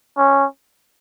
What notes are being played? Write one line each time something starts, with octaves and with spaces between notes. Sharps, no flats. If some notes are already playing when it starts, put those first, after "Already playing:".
C#4